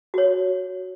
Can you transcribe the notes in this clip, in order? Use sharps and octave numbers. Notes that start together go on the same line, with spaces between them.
F#4 C#5